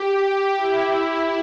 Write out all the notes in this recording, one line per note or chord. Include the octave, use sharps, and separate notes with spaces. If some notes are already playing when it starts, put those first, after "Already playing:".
Already playing: G4
E4